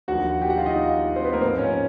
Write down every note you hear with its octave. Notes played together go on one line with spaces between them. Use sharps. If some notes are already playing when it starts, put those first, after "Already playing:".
D#2 D3 F3 F#4 F#5
G4 G5
F#4 F#5
F4 F5
D#4 D#5
C4 C5
B3 B4
A#3 A#4
G#2 F3 C4 C5
C#4 C#5